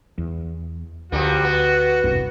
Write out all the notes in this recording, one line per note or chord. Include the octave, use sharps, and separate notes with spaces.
E2
D2 F3 G3 A#3 F#4
B3
E1 C2 G2